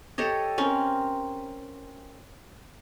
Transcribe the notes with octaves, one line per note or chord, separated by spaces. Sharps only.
G4 A4 C#5 D#5
C4 C#4 A#4